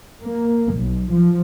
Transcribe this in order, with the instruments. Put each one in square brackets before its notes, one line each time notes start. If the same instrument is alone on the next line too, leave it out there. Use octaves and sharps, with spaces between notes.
[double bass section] A#3
B1
F3